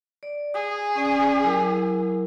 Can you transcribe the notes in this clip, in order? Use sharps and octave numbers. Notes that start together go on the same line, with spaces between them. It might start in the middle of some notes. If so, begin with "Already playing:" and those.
D5
G#4 D#6
C#4 D5
F#3 E4 A#4